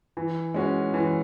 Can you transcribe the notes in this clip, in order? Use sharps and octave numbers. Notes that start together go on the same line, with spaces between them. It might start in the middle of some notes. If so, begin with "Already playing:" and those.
E3
G#3 C#4 F#4
E3